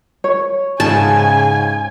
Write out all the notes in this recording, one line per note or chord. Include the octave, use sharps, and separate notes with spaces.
C#5
G#2 C#3 G#5 A5